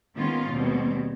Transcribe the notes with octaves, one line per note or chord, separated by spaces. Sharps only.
D#3 G#3 A#3 B3 C#4 F4
D#2 B2 G3 G#3 C4